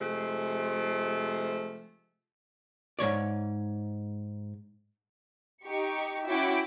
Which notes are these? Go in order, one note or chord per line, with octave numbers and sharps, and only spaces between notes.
C3 F3 G#3 A3
G#2 B2 C#5 D5
D#4 G4 C#6
C#4 E4 F#4 E5 G5 D6